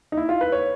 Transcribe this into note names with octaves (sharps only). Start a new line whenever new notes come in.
D#4
E4
F4
B4
C#5